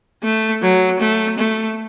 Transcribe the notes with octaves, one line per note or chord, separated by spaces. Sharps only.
A3
F#3
A3
A3